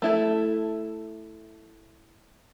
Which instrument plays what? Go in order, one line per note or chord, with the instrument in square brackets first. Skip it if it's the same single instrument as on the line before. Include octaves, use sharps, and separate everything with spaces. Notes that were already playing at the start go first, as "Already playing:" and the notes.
[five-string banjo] A3 E4 A4